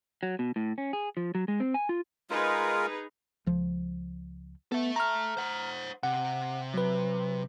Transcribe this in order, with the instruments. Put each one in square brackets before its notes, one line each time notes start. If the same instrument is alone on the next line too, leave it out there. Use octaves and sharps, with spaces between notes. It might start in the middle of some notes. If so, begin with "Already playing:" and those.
[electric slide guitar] F#3
B2
A2
C#4
G#4
F3
F#3
G#3
C4
G#5
F4
[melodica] G#3 F4 A#4 [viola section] D#4 G#4 B4
[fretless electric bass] C#2 F3
[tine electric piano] B3 [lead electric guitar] A4 E5
[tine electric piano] A#5 F6
[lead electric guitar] C5 F#5
[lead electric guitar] C3 [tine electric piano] F#5
[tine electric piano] F#3 B4